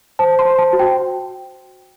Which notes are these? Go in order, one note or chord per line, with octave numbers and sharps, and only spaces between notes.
C5 A5
C6
C5
A5
F#4
G5